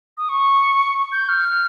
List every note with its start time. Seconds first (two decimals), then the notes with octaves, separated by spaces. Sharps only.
0.18 D#6
0.29 C#6
1.12 G6
1.29 F6